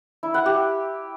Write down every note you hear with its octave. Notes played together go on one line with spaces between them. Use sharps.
E4
F#5
G4